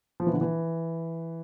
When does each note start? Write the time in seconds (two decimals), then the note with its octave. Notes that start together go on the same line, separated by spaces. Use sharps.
0.20 F3
0.27 E3
0.33 D3
0.41 E3